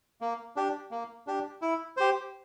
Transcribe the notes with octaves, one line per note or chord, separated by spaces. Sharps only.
A#3
D4 G4
A#3
D4 G4
E4
G4 C5